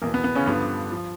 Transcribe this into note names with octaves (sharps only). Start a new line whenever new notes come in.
E2 B2 A#3
B3
B3
C#3 C#4
G2 D3 F3 B3
F3